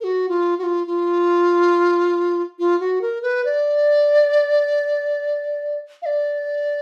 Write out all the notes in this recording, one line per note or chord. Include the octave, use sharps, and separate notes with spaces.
A#4
F#4
F4
F#4
F4
F4
F4
F#4
A#4
B4
D5
F5
D5